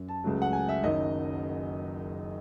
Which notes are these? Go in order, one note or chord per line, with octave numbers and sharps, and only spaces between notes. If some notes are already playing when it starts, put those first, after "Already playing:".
Already playing: F#2
A5
C#2 C#3 F#3 A3
F#5
G#5
E5
F#1 F#2 D#3 F#3 D#5